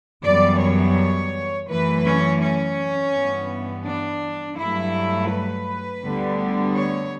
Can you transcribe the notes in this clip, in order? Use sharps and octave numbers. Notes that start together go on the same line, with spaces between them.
F#2 E3 G3 B3 D5
C#5
F#2 E3 A3 B4
C#4
C#4
G2 E3 B3
D4
G2 F#3 A3 E4
B4
D2 D3 G3 B3
C#5